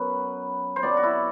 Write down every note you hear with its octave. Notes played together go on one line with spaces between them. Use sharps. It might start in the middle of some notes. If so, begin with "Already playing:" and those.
Already playing: F#2 F#3 B3 B4
C5
C3 F#3 B3 D5
F#4
E4